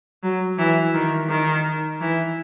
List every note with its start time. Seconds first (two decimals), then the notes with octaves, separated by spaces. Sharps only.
0.23 F#3
0.58 E3
0.94 D#3
1.29 D#3
2.01 E3